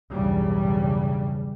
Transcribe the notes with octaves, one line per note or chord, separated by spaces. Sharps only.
B1 E2 G2 C#3 G3